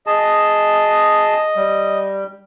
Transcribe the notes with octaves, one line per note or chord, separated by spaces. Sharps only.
G#4 D#5 A5
G3